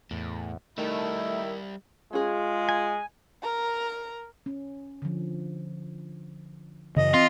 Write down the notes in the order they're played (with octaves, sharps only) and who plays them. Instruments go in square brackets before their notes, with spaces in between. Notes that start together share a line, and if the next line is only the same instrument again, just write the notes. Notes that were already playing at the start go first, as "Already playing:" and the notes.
[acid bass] E2 [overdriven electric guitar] A2
[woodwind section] D#3 E4 [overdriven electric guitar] G3 E5 [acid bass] A3
[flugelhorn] G#3 [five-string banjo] C#4 G#4 [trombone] F4
[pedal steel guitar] G#5
[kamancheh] A#4 A#5
[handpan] C#4
D3 F3
[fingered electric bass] F#2 C#3 [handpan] E3 [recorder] D#5
[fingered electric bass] C4 [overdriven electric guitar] F4